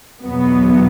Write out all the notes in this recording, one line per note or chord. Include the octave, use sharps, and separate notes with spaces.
E2 B2 F#3 B3